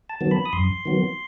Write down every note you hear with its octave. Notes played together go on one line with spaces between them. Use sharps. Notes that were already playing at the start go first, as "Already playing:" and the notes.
A5
D#3 F#3 B3
B5
D#6
F#2 C6
D#3 F#3 B3